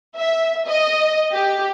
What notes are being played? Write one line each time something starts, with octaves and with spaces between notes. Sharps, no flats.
E5
D#5
G4